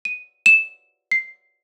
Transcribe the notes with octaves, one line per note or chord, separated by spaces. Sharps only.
D#7
E7
C7